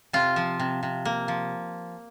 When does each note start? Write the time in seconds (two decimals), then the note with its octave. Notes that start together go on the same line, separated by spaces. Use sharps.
0.13 C3 F4
0.36 F3
0.59 C3
0.83 C3
1.05 A#3
1.28 F3